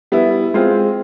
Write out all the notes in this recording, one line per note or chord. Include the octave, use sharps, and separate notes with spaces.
G3 B3 E4
G#3 C4 F4